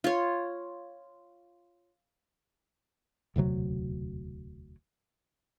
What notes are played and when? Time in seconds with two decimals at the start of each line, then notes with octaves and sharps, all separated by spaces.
0.04 F4 C#5
3.36 E1 D2 C3 F#3